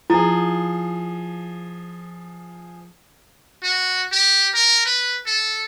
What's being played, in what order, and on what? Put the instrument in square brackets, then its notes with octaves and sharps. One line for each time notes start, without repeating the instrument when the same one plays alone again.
[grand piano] F3 G#4 [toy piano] E4
[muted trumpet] F#4
G4
A#4
B4
A4